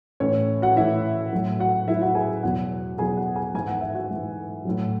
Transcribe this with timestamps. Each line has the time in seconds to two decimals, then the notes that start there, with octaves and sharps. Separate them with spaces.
0.20 A2 E3 C#4 C#5
0.62 F#4 F#5
0.76 A2 E3 E4 E5
1.33 A2 F#3
1.60 F#4 F#5
1.87 A2 F#3 E4 E5
2.01 F#4 F#5
2.15 G#4 G#5
2.43 E2 B2 F#3 F#4 F#5
2.98 E2 B2 F#3 G#4 G#5
3.17 F#4 F#5
3.36 G#4 G#5
3.54 G#2 E3 G#5
3.67 F#5
3.81 E5
3.94 F#4 F#5
4.11 G#2 E3
4.65 A2 F#3